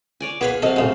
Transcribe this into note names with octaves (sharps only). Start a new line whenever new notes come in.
C#5 D5 G#5
B3 G#4 B4 C#5 F5 B5
C3 F#3 A4 D#5 F5
A2 C#3 G#3